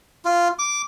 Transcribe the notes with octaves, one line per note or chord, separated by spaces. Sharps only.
F4
D6